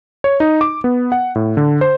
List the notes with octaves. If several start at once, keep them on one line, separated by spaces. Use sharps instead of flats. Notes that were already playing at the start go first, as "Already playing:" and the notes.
C#5
D#4
D6
B3
F#5
A2
D3
C5